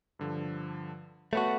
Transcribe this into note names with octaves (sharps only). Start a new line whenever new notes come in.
G2 D3 F3
A3 B3 F#4 C#5 F#5 A5